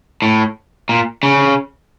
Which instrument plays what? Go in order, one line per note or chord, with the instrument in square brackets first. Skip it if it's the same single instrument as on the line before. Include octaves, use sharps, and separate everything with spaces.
[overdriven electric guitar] A2
A#2
C#3